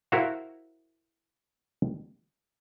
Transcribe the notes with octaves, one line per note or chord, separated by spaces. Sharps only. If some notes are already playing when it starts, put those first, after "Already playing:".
E4 F#4 A#4 C5 F5